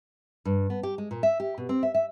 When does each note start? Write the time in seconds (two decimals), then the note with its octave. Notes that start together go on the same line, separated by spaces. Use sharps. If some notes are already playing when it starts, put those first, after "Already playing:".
0.45 G2
0.70 B3
0.83 G4
0.98 G#3
1.11 A#2
1.23 E5
1.40 G4
1.58 B2
1.69 C4
1.83 E5
1.95 E5